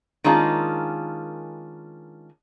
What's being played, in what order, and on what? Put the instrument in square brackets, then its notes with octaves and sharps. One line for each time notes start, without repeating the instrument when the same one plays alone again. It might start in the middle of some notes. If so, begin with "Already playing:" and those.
[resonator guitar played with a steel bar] D#3 G#3 A#3 C#4 D4 F4